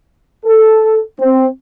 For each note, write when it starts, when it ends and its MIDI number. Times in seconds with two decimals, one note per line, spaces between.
0.45 1.00 69
1.20 1.46 60